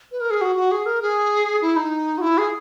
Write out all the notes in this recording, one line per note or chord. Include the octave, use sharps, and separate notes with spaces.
B4
A#4
G#4
F#4
F#4
G#4
A#4
G#4
E4
D#4
F#4
E4
G#4